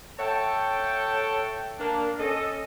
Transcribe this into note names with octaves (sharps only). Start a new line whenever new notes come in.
A4 C#5 E5 F#5 G5 A5
A#3 D4
C#4 A4 D#5